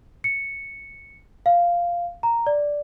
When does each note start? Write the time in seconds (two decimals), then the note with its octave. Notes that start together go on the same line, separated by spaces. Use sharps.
0.24 C#7
1.46 F5
2.23 A#5
2.47 D5